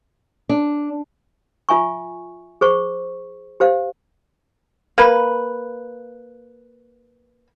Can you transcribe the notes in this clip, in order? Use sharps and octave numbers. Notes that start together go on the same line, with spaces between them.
D4
F4 E5 G#5 C#6
G#4 C5 C#6
G4 C5 F5
A#3 B4